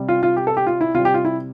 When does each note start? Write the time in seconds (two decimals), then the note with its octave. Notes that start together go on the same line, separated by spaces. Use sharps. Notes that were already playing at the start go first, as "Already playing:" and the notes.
Already playing: C3 G3
0.09 F4
0.23 F4
0.36 G4
0.47 A4
0.57 G4
0.67 F4
0.81 E4
0.94 C3 F4
0.97 G3
1.05 G4
1.14 F4
1.25 E4